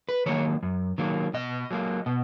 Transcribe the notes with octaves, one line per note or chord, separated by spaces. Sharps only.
B4
D#3 F#3 A#3 C#5
F#2
D#3 F#3 A#3
B2 D#5
F#3 A#3
B2